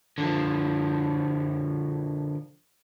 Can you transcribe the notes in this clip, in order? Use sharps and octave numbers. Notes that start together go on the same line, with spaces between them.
D3 F3